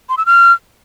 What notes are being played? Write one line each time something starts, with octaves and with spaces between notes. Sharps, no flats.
C6
E6
F6